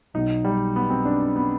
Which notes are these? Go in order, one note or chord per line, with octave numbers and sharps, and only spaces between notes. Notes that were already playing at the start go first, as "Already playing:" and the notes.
B1 B2 D#4
G3
B3
C4
D4
B3